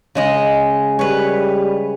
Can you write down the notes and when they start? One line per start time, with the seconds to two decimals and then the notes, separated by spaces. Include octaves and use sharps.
0.15 C#3 G#3 D#5
0.99 G3 B4 C#5